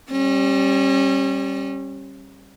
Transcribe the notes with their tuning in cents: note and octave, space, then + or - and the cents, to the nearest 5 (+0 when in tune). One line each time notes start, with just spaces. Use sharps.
G3 +0 C#4 -35